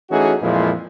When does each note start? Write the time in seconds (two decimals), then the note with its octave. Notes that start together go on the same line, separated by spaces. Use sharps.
0.10 E3 A3 C#4 D#4 F#4 G#4
0.41 F2 A#2 E3 F3 G#3 E4